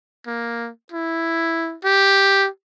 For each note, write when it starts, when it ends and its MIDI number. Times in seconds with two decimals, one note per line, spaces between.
0.27 0.70 58
0.92 1.76 64
1.84 2.48 67